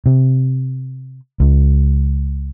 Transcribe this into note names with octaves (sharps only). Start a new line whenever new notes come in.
C3
C#2